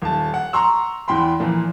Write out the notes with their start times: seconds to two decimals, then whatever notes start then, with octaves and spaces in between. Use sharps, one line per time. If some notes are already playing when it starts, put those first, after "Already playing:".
0.02 D#1 A5
0.34 F#5
0.53 A#5 C6 C#6 E6
1.08 E2 E3 G5 B5 C6
1.40 A#2 E3 F3 A#3